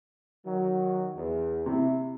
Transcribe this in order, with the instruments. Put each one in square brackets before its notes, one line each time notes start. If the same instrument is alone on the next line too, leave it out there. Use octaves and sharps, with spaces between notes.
[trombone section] D#3 F#3
E2
[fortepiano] C3 [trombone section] E4